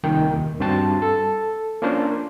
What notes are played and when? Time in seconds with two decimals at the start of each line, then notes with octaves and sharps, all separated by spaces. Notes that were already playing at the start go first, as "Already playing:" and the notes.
0.03 C2 A#2 D#3 G5
0.34 D#2
0.60 G2 C4 F#4 C5 A5
1.02 A4
1.82 A#3 C#4 D4 F4 C5